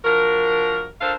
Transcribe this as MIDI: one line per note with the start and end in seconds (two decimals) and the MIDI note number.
0.05 0.85 53
0.05 0.85 62
0.05 0.85 66
0.05 0.85 70
1.01 1.13 62
1.01 1.13 65
1.01 1.13 69
1.01 1.13 70
1.01 1.13 72
1.01 1.13 77